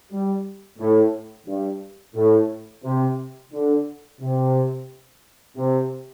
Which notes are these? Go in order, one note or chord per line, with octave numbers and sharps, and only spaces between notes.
G3
A2
G2
A2
C3
D3
C3
C3